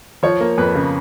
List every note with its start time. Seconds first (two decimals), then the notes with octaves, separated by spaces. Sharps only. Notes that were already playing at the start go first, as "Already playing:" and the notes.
0.23 F3 C#5
0.40 A#3
0.58 F2 B4
0.75 C#3